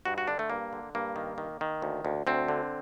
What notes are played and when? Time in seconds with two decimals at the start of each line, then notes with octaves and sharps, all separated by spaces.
0.05 G2 F#4
0.18 F#4
0.28 D3 D4
0.39 A3
0.50 G2 A#3
0.73 D3
0.95 G2 A#3
1.16 D#3
1.38 D#3
1.61 D#3
1.82 D2
2.05 D2
2.27 D2 C4
2.48 D3